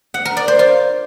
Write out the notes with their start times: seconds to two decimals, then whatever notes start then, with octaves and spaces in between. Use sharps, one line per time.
0.14 F#5
0.25 A#4
0.37 D5
0.48 C5
0.59 F4